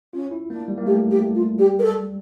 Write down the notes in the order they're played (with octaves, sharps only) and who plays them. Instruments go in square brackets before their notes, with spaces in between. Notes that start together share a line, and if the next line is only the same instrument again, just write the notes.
[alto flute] C#4 [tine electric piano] F4
[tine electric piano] E4
[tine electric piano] A#3 [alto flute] D4
[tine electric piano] G3
A#3
[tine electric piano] A3 [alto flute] G4
[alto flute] G4
[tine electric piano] A3
[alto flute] F4
[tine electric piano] G3 [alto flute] G4
[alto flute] A#4
A4